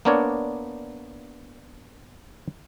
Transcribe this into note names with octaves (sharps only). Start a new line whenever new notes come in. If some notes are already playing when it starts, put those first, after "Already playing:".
A#3 B3 D4 A#4 C#5 D5